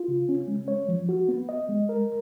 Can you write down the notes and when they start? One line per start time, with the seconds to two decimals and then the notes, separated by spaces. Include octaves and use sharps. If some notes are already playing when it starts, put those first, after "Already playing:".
Already playing: F4
0.08 C#3
0.29 C#4
0.48 G#3
0.68 C#5
0.89 F3
1.09 F#4
1.29 B3
1.49 D#5
1.69 G#3
1.89 A#4